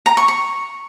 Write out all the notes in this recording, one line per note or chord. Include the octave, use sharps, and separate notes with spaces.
A#5
C#6
C#6